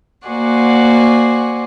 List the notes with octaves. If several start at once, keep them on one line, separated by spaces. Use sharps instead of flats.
A#3 F#4 C5 D5 F#5 G#5